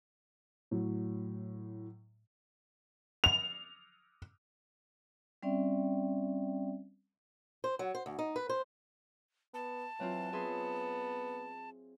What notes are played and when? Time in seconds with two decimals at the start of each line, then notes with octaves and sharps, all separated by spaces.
0.71 A2 F#3
3.24 F7
5.43 G3 C4 C#4 D5 E5 G5
7.64 C5
7.79 F#3
7.95 C5
8.06 D2
8.19 D#4
8.36 B4
8.49 C5
9.54 B3 A5
10.00 E3 F#3 C4 F4
10.33 B3 G#4 E5 C6